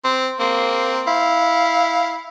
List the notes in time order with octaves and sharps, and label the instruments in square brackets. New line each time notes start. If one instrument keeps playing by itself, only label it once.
[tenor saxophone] C4
[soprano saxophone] A#3 [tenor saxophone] C4
[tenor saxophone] E4 [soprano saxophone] F5